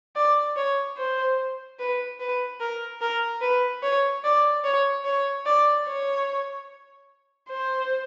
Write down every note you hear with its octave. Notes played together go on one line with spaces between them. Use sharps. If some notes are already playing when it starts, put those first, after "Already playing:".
D5
C#5
C5
B4
B4
A#4
A#4
B4
C#5
D5
C#5
C#5
D5
C#5
C5